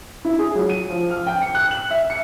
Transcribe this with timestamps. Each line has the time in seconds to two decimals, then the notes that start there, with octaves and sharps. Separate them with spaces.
0.25 E4
0.39 G#4
0.55 F#3
0.70 D#7
0.90 F3
1.10 F6
1.26 G5
1.42 C#7
1.55 F#6
1.71 F#7
1.90 E5
2.10 C#7